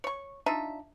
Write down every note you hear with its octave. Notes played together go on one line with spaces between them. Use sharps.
C#5 C#6
D4 D#4 F4 E5